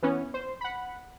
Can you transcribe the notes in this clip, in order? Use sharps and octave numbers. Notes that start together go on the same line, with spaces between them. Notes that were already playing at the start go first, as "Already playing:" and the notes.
E3 B3 C#4
C5
F#5 B5